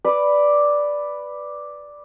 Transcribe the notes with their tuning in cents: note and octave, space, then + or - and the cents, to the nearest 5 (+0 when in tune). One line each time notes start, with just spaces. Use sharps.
B4 +0 D5 +0